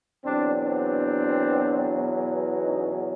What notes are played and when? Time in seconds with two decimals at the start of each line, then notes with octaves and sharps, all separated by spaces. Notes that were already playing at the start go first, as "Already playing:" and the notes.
0.24 E2 B2 F#3 C4 D4
0.64 C4 D4
2.62 C#4 D#4